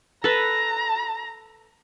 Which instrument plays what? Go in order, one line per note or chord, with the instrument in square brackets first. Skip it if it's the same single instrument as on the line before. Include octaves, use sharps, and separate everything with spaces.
[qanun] A4 B4 [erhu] A#5